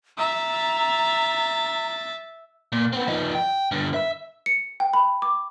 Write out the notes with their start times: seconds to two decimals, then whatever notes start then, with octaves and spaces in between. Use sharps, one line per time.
0.19 E5 A#5 A6
2.72 A#2
2.93 B3 C4
3.08 F3 D#4
3.35 G5
3.72 G2 D3
3.94 E5
4.46 C#7
4.80 G5
4.93 B5
5.22 D6